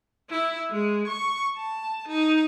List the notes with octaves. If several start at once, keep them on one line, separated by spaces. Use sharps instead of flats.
E4
G#3
C#6
A5
D#4